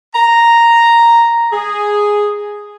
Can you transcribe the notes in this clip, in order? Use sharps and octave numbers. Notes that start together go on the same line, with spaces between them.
A#5
G#4